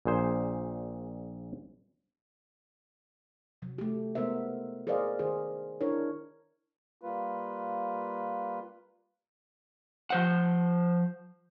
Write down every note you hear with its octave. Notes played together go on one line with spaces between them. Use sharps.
A#1 A#2 G#4 C5
C3 F#3
A3 G4
G#3 B3 A#4 C5 E5
G#4 A#4 C5 D5 D#5 F5
D#3 G#4 C5
D4 E4 A#4 C#5
G3 A#3 F4 B4
F3 C5 F#5